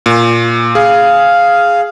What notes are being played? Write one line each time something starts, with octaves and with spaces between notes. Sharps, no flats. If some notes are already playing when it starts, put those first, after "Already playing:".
A#2
G#4 F5